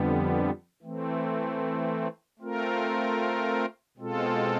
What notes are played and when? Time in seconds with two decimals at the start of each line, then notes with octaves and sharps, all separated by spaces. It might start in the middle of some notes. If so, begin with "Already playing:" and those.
Already playing: F2 D3 G3 B3
0.83 E3 A3 C4
2.39 A3 C4 F4 A#4
3.97 B2 G#3 C4 F4 A4